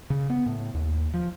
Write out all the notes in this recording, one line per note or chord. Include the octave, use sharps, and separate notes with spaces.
C#3
B3
A2
D#2
F3